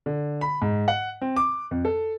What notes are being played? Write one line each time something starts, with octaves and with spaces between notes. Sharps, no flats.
D3
B5
G#2
F#5
C4
D6
F2
A4